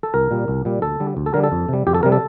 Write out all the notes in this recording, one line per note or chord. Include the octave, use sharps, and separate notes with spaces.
A4
C2 A#4
A#2 G3
C2
A#2 G3
D2 A4
D3 G3
D2
A4
D3 G3 A#4
A4
F2
C3 G3
F2 G4
A4
C3 G3 A#4
A4